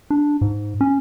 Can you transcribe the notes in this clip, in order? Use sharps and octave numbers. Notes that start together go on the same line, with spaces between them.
D4
G#2
C#4